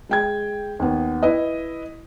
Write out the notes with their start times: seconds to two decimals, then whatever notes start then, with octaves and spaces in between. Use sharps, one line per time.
0.09 G#3 G5 G#6
0.79 D#2 B3
1.23 E4 B4 D#5